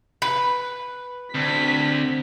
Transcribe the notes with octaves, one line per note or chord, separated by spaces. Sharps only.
B4
D2 C4 B6